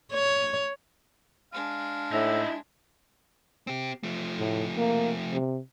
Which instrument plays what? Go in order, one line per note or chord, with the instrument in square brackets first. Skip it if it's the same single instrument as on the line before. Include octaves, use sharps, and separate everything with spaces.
[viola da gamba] C#5
[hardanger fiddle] G#3 D4 [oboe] F5
[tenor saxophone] A2 [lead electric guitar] D#4 E4 [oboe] E5
[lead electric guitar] C4 G4
F3 A3
[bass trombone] A2
A#3
C3